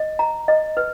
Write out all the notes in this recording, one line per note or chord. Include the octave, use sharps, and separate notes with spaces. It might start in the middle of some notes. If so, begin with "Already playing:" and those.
Already playing: D#5
A#5
D#5
B4